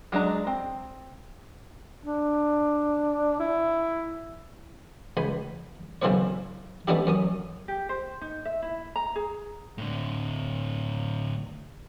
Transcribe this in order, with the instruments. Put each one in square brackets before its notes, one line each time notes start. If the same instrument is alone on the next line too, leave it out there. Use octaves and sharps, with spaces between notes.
[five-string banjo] F#3 G#3 D4 A#5
C4
[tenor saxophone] D4
E4
[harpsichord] C#2 G#5 B5
B1 C#3 E3 C4 B4 C#5
A3 B3 C#4 D4 E4 G4
F#2 C#4 D#6
[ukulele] G4
C5
D#4
E5
E4
A#5
G#4
[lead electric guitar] A2 D3